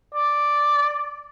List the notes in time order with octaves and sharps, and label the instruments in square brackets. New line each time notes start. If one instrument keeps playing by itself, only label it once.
[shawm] D5